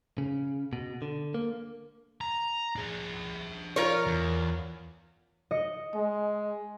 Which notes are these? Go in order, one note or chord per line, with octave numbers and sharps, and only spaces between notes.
C#3
B2
D3
A#3
A#5
D4 G#4
F4 A#4 C#5
E2
D#5 C#7
G#3